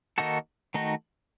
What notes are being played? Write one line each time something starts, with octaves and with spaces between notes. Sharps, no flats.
D#3 A#3 D#4 F#4 A4
D#3 A3 D#4 F#4